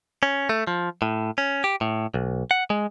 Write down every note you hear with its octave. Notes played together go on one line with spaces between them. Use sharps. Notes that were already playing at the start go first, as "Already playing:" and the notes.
C#4
A3
F3
A2
C#4
G4
A2
B1
F#5
G#3